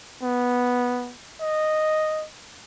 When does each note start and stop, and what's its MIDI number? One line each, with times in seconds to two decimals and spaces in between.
0.23 1.14 59
1.41 2.25 75